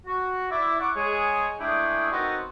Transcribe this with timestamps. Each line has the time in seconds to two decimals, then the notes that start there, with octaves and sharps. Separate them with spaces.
0.07 F#4
0.51 E4 D5
0.80 F#5 C#6 D6
0.96 G#3 G#4 C#5
1.60 G#3 A3 D4 E4 G#4 G5
2.11 B3 C4 D#4 F#4 A#4 B4